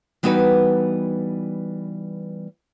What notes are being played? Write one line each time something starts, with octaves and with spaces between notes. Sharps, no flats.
E3 G3 B3 D#4 F#4 B4